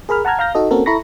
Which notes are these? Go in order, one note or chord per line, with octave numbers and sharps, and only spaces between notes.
G#4 A#4 B5 F6
F#5 A5 A#5 F6 G#6
F5 A#5 F6 G6 A#6
D#4 F#4 A4 D#5
A#3 C4 C#4 F#4 A4 A#4
E4 A4 A#5 B5 C#6 A#6